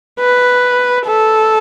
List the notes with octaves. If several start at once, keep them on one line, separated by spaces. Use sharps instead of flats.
B4
A4